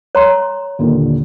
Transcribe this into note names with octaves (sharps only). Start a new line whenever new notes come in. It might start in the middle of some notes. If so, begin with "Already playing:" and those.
C#5 A#5 C6
D#2 A#2 D3